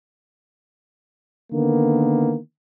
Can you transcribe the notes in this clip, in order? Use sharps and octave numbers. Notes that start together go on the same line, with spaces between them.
D3 D#3 A#3 B3